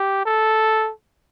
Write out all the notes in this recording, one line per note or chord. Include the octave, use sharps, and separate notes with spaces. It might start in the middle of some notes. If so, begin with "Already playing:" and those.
Already playing: G4
A4